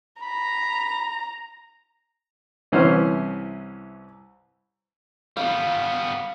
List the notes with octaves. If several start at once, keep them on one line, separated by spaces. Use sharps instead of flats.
A#5 B5
C2 E3 C#4 C5 F6
G3 B3 F5